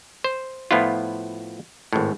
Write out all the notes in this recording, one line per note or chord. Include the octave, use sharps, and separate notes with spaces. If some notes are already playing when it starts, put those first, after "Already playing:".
C5
A2 F3 B3 E4 F4
G#1 A2